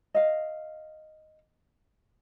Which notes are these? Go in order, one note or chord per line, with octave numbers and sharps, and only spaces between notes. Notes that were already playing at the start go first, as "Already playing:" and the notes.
D#5 F5